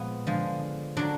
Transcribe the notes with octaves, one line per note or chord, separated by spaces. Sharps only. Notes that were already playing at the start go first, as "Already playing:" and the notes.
Already playing: A#2 F3 G#3 B3
D3 F3 G#3
D3 F#3 D4